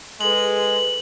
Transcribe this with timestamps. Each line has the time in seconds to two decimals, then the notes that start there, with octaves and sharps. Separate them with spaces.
0.21 G#3 G#4 A4 B4 F#7